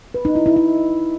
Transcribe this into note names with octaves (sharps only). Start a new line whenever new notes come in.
B4
D#4
E4
E4
E4